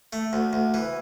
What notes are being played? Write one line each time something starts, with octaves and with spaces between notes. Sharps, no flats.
A3
D2
D2
E3